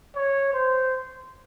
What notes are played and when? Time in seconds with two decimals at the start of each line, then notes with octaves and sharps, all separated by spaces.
0.16 C#5
0.53 C5